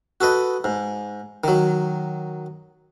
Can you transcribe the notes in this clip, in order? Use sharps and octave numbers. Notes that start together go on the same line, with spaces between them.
F#4 A4 B4 D#5
G#2
D#3 F#3